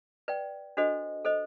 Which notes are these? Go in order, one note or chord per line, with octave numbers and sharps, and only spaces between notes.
B4 D5 G5
D4 F#4 A4 C5 D#5
A4 C5 D#5